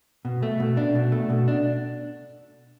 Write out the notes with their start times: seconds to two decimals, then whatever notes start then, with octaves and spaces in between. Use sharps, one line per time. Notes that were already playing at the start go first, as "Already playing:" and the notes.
0.25 B2
0.43 A3
0.60 B2
0.77 D4
0.95 B2
1.12 A3
1.30 B2
1.48 D4